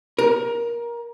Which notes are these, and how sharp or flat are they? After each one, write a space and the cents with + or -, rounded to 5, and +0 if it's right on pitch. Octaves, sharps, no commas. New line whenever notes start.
A#4 +20